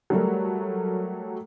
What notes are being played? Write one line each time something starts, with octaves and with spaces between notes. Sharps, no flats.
F#3 G3 A3 A#4